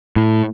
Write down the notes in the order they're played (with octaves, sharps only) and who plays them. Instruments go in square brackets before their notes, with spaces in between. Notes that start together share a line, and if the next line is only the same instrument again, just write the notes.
[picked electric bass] A2